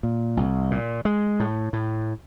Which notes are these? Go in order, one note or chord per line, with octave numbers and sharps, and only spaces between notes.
A#2
C2
A#2
G#3
A2
A2